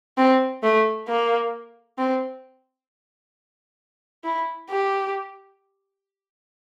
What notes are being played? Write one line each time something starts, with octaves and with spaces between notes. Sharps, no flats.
C4
A3
A#3
C4
E4
G4